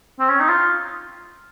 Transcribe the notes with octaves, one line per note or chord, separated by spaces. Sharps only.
C4
C#4
D#4
F4